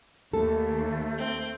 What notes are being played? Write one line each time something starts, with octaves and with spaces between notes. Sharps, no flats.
D#2 A3 A4
C4 G6